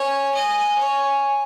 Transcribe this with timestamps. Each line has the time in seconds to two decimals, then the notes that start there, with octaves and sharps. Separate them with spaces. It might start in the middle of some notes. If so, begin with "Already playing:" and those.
Already playing: C#5 G#5
0.35 D#5
0.78 C#5